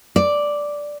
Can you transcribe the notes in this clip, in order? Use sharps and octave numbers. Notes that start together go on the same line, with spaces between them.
D5